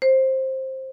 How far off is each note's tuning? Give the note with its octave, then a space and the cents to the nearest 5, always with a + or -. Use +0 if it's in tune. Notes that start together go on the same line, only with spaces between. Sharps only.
C5 +15